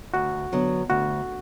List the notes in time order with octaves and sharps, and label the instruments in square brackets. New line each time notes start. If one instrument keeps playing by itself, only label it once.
[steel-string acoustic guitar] D2 [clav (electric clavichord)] F#4
[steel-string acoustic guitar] D3 F#3 B3
[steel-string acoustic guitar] D2 [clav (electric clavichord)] F#4